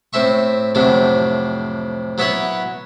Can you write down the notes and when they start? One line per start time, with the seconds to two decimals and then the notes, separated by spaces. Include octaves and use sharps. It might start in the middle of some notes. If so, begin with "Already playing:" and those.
0.13 A2 C4 E5 C#6
0.75 F2 A2 C3 F#3 D4
2.18 F#3 B3 E4 B4 C#5 F#5